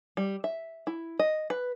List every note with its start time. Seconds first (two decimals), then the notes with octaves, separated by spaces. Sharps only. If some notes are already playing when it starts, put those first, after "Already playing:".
0.17 G3
0.44 E5
0.87 E4
1.19 D#5
1.50 B4